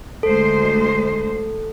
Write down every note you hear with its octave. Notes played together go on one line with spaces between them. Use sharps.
D2 G#3 A4 C5